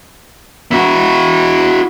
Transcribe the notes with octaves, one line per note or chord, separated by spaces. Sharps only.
E4 F#4